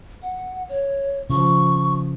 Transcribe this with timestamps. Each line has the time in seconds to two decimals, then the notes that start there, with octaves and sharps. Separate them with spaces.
0.22 F#5
0.69 C#5
1.30 C#3 F3 C#6